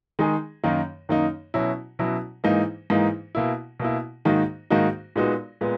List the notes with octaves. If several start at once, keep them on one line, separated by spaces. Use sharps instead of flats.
D#3 G#3 D#4 G#4
F#2 D#3 A#3 D#4
F#2 D#3 A#3 D#4
B2 F#3 C#4 E4
B2 F#3 C#4 E4
G#2 E3 A#3 D#4
G#2 E3 A#3 D#4
B2 A#3 E4
B2 A#3 E4
G#2 D#3 A#3 D#4 F#4
G#2 D#3 A#3 D#4 F#4
A#2 G#3 B3 D#4 F#4
A#2 G#3 B3